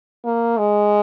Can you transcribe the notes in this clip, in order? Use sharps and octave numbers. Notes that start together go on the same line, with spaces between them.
A#3
G#3